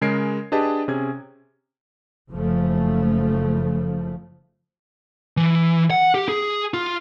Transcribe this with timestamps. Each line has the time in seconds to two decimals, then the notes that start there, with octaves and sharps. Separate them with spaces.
0.01 C#3 G#3 A#4 G#6 C7 D7
0.52 D4 G4 G#4 B4 D#5 A5
0.88 C3 C#4 G#4 G#6
2.31 F#1 C#3 F3 A3
5.37 E3
5.91 F#5
6.14 G4
6.29 G#4
6.74 F4